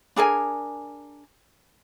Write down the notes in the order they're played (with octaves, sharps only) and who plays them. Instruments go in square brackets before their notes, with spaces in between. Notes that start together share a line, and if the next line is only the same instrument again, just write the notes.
[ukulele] D4 G#4 A#4 G#5